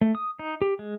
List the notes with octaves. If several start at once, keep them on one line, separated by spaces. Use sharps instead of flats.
A3
D#6
D#4
G4
G#3